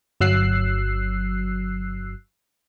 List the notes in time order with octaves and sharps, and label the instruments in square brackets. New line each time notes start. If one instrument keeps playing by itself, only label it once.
[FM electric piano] G1 F#3 E6 F#6 C7